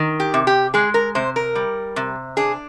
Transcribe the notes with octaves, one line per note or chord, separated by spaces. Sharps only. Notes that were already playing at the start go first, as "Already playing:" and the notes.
Already playing: D#3
G4
C3
G4
G#3 G#4
A#4
C3 C5
A#4
G3
C3
D4 G#4